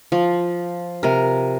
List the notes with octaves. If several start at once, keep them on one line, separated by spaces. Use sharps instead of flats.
F3
C3 A#4